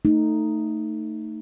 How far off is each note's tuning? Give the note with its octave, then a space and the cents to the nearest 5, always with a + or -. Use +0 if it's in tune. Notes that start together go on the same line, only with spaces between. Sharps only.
A3 +20 D#4 +0